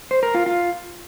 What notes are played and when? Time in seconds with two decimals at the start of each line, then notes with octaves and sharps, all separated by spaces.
0.11 C5
0.23 A#4
0.34 F4
0.46 F4